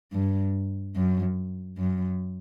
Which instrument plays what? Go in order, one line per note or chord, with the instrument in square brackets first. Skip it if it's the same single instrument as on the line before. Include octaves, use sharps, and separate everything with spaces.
[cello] G2
F#2
F#2